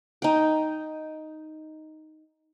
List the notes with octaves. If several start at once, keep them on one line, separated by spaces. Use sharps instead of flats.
D#4 G5